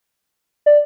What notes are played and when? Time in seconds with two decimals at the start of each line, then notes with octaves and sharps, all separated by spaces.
0.66 D5